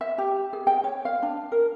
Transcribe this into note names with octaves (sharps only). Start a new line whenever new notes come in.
E5
G4
G#4
G5
C#5
F5
D4
A#4